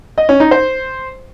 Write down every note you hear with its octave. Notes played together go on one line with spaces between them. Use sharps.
D#5
C#4
D#4
C5